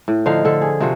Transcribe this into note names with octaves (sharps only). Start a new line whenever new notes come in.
A2
D3 F3 D#4 F5
D3 A4
G#4
C3 F3 F#4